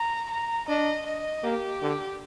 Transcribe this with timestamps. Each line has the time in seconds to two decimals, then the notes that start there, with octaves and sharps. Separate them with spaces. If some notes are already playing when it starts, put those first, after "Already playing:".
Already playing: A#5
0.30 A#5
0.68 D4 D#5
1.06 D#5
1.43 A#3 G4
1.81 D3